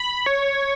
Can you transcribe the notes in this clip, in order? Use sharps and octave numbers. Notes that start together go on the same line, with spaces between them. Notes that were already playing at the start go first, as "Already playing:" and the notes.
Already playing: B5
C#5